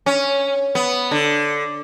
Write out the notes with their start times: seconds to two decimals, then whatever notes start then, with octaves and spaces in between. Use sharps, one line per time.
0.06 C#4
0.75 B3
1.11 D3